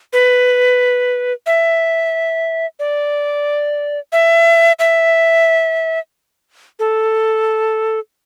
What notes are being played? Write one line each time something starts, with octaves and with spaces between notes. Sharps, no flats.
B4
E5
D5
E5
E5
A4